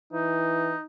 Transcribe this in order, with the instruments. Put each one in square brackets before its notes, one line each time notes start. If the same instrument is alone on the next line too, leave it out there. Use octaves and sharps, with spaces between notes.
[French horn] E3 [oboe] D#4